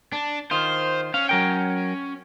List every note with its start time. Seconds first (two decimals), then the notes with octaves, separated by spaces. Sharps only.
0.13 D4
0.51 D#3 F4 C5
1.14 C#4 F5
1.29 F#3 A#4 G5